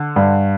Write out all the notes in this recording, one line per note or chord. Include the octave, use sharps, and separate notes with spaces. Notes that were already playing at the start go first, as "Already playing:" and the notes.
Already playing: D3
G2